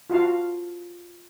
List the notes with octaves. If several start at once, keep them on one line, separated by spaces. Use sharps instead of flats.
F4 F#4 F5 A5